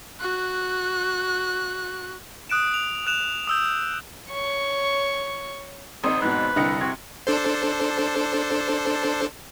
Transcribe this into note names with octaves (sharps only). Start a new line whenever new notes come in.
F#4 F#6
D#6 F#6 D7 E7
F7
D#6 F#6 E7 F7
D#6 E6 G6
C#5 C#6
G#1 C4 D#4 C5 D#6
G#2 B2 B4
C2 D3 D#5 C#7
C3 F#4 G#6
D4 A4 C5